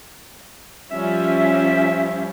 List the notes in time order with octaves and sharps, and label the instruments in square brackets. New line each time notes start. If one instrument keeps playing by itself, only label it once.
[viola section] F3 G3 C#4 [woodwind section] E5